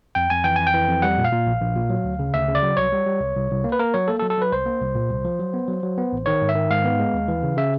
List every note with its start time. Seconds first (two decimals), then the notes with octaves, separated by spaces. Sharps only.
0.15 F2 G5
0.30 F2 G#5
0.44 E3 G5
0.56 F2 G#5
0.67 G5
0.74 E3
0.88 F2
1.02 G3 F#5
1.18 A#2
1.24 F5
1.32 A#2
1.47 A#1
1.61 A#1
1.76 A#2
1.90 F#3
2.04 D2
2.19 C#3
2.34 D2 E5
2.48 C#3
2.55 D5
2.63 F#3
2.77 C2 C#5
2.92 G3
3.06 G3
3.20 C2
3.36 C2
3.51 C2
3.64 A#3
3.72 B4
3.79 A#3 A#4
3.94 F#3 C#5
4.08 A#3 A4
4.19 A4
4.22 F#3
4.30 A4
4.38 F#3 B4
4.52 C2 C5
4.66 A#3
4.81 C2
4.95 A#2
5.11 C2
5.25 F3
5.39 F#3
5.54 B3
5.68 F#3
5.83 F#3
5.98 B3
6.12 A1
6.26 D#3 C#5
6.42 G#2
6.49 E5
6.55 D#3
6.70 G#2 F5
6.84 B3
6.99 G#3
7.14 D#2
7.28 E3
7.43 C#3
7.57 C#3 E5